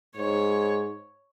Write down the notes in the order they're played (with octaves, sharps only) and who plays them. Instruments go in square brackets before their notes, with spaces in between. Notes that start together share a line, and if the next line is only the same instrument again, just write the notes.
[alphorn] G#2 [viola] C#5